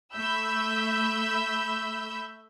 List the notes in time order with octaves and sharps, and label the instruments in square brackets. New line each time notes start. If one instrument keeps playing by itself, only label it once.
[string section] A3 E5 B5 E6 G6